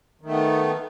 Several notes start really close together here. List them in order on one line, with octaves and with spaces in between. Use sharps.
D#3 A3 B3